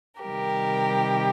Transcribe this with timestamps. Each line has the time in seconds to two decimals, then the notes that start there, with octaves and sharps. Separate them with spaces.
0.22 C3 D#3 G3 G4 A#4